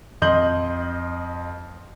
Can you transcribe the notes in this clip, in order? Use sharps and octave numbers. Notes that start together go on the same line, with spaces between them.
F2 D#5 C6 G6 F#7